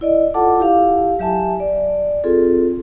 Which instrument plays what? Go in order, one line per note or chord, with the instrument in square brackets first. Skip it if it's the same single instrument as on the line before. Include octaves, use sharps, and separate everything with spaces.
[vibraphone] E4 D5 D#5
F4 A4 F#5 A5 D6
E4 G4 F5
F#3 G4 E5 G#5 A5
D5
C4 F4 G#4 A4